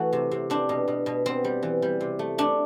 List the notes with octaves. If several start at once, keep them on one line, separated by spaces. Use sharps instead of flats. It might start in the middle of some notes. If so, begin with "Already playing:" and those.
Already playing: E3 A3 F#4
C3
C3
C4 D4
B2
B2
B2
B3 C4
G3
E3
G3
C3
A3
A3 D4